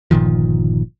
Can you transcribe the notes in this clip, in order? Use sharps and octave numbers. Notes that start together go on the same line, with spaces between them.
G1 A#2 D#3 F3